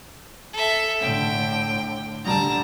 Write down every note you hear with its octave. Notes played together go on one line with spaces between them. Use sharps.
A4 E5
A2 D3 G5
D3 G3 A5 A#5